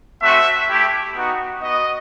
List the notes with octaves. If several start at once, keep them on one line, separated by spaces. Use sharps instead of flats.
A3 C4 F#4 E5
A3 E4 G4
B3 D#4 F#4
B3 F#4 D#5